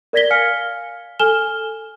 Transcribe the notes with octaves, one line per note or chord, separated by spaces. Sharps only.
A#4 D5 G#6 A#6 B6 G7
F5 G#5 F6 B6 C#7
A4 G#5 F6 E7 G7